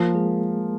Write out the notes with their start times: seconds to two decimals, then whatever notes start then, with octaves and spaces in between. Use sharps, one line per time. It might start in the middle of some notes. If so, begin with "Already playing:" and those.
Already playing: F3 A#3 A#4
0.14 G#3 G#4